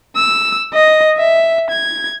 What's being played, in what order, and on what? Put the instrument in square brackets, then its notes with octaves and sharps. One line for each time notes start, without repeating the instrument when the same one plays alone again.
[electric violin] E6
D#5
E5
G#6